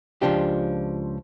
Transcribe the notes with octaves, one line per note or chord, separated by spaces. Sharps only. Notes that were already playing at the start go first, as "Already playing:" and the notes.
C#2 F3 D4 G4